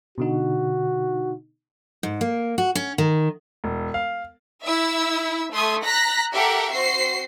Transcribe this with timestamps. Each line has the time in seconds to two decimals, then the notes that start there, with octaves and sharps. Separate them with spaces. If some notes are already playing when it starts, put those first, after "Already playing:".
0.18 B2 D3 D#4 F#4
2.03 G#2
2.21 A#3
2.58 F#4
2.75 C#4
2.98 D#3
3.64 E1
3.94 F5
4.65 E4 E5 E6
5.52 A3 C6 D#6 G#6
5.85 A#5 F#6 A#6 B6
6.32 G4 A4 A#4 E5 F#5
6.73 C4 F#4 C5 C7